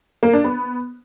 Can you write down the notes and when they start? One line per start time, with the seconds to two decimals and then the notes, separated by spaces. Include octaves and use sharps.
0.23 A#3
0.33 D4
0.44 B3